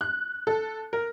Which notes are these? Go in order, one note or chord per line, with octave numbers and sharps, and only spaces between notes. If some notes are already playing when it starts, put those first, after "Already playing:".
F#6
A4
A#4